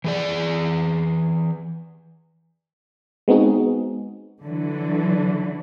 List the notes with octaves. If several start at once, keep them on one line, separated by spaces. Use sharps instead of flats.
E3 G#4 D5
G#3 B3 C4 D#4 F#4 G#4
D3 E3 F#3